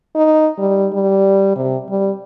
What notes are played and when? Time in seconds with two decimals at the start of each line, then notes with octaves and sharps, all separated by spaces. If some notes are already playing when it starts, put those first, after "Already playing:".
0.15 D#4
0.58 G3
0.93 G3
1.56 C3
1.89 G3